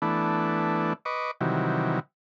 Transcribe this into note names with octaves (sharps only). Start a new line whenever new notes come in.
E3 A3 B3 D4
B4 D#5 C#6 D6
C3 D#3 E3 F#3 G3